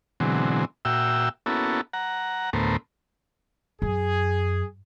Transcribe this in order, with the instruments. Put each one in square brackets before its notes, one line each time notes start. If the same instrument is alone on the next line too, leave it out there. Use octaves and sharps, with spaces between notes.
[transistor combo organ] B2 D3 E3 F#3 G#3 C4
A#2 F#4 E5 G5 E6
A#3 B3 C#4 E4 F#4 A4
F#5 A#5
D2 A2 A3 B3 A#4 C5
[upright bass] F#2 [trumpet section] G#4